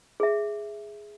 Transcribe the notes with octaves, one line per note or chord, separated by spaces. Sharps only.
G#4 E5